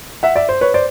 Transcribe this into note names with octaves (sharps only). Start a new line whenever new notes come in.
E5 F#5
D5 E5
C5
B4 C#5
C5 D5